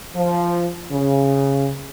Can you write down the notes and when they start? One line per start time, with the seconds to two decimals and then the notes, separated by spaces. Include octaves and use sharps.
0.15 F3
0.91 C#3